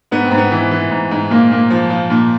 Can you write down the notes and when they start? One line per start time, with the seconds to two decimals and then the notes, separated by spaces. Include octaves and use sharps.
0.11 G#2 B3
0.25 C4
0.31 G#2
0.38 B3
0.52 E3
0.71 E3
0.90 G#2
1.11 G#2
1.30 A#2 A#3
1.51 A#2 A#3
1.70 F3
1.90 F3
2.10 A#2